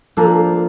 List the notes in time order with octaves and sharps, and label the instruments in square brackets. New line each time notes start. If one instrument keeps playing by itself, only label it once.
[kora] F3 A#3 D4 [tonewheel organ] A4